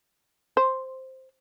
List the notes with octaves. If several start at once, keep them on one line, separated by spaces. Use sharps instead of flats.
C5